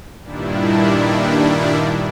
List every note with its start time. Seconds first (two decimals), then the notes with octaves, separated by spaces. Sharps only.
0.23 G2 A#2 D#3 G3 D4 E4